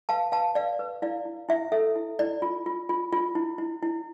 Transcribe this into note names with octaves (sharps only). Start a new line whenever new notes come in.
B4 F5 A5
B4 F5 A5
B4 D5 F5
B4
E4 D5 F5
E4
E4 E5
A4 E5
E4
E4 D5
F4
F4
F4
F4
E4
E4
E4